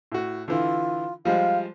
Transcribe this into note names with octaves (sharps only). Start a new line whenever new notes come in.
A2 F#4
D3 E3 F4
F3 G3 G#3 F5